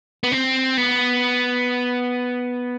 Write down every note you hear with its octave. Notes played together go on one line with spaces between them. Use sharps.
B3
C4
B3